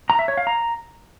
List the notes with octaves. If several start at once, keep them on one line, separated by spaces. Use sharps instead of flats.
A#5
E5
C#5
F5
A#5